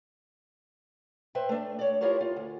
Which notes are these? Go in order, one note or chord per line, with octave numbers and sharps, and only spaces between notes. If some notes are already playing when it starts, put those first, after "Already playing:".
B4 C5 E5 G5
A3 D4
C#5 D5
E4 F4 G4 A#4 C5 C#5
F4
D2